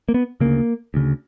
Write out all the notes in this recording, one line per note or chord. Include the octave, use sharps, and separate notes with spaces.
A#3
B3
D2 C#3 A#3
D2 C#3